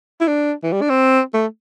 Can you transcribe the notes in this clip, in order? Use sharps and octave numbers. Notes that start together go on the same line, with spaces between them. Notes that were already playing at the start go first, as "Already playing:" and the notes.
E4
D4
E3
G3
D4
C4
A3